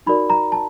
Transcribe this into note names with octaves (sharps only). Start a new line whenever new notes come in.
D#4 F#4 A#4 D5 B5
A#5
A5